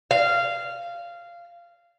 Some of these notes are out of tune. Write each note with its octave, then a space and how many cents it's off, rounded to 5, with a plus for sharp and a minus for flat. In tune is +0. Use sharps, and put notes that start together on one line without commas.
F5 -15